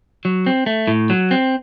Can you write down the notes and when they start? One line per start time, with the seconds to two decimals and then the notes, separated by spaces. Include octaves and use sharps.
0.25 F#3
0.46 C4
0.66 A3
0.88 A2
1.10 F#3
1.31 C4